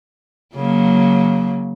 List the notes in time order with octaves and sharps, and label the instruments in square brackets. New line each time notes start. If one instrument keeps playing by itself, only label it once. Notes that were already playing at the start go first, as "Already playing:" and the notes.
[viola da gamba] C#3 F#3 A#3